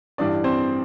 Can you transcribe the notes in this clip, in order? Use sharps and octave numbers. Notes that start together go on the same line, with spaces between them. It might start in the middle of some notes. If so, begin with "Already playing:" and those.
A1 G2 E3 G3 D4 D5
C4 C5